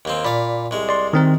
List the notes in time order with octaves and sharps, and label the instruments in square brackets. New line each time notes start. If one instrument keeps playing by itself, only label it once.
[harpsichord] D#2 A#3 C4
[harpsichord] A#2 F5 [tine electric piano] D5 B5
[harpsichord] C2 G#3
[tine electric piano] D5 C6
D#3 C4 A#4